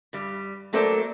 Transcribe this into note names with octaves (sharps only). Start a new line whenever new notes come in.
G2 G3
F#3 A3 A#3 A4 C5 D5